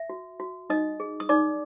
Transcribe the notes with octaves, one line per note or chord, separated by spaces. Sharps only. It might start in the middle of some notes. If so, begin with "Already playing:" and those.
Already playing: E5
F#4
F#4
D#4 D#5 D#6
G#4
D#6
D#4 D5 D6